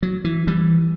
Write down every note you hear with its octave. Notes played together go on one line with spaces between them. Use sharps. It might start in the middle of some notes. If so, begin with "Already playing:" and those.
F#3
E3
E3 G3